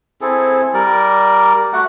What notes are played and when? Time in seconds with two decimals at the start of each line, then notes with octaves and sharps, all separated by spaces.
0.21 C4 E4 G#4 A4
0.74 G3 A#4 D5
1.73 A3 F#4 F#5